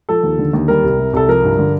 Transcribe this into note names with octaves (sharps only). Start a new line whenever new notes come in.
F3 A4
D#2
D3
D#2
G3 A#4
C2
C3
C2 A4
F3 A#4
G2
D3